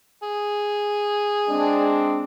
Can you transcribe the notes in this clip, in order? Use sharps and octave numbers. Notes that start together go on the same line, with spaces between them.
G#4
G#3 C4 D4